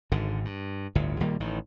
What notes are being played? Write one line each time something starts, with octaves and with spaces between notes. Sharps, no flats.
G#1 G#2 D3
G2
G1 D2 A2
A#1 D#3 G3 A#3
A1 A2 D#3